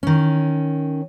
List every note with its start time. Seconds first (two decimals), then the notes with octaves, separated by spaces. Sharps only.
0.03 D#3 C#4